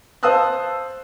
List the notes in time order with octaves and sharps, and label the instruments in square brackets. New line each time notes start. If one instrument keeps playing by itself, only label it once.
[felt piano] C5 F5 A5 D#6 E6 F#6